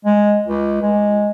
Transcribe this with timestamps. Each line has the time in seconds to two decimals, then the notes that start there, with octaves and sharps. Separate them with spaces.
0.05 G#3
0.46 C#2
0.82 G#3